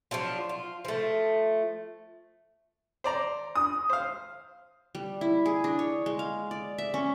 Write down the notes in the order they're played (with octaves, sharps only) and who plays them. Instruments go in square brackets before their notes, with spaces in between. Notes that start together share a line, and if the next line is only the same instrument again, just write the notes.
[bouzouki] F3 F#3 D4 F4
F4
F3 A3
[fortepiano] C5 D5 A#5
[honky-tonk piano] D#6
[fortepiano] C5 F5
[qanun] G3
E4
G#4
D4
C#5
G#3
F5
D5
E5
C#4